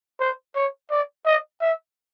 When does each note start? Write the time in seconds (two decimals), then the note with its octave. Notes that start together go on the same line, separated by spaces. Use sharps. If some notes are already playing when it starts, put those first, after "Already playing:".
0.20 C5
0.55 C#5
0.90 D5
1.26 D#5
1.61 E5